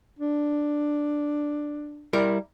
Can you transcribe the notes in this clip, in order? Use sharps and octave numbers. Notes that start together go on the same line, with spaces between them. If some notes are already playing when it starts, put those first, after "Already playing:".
D4
G3 E4 A#4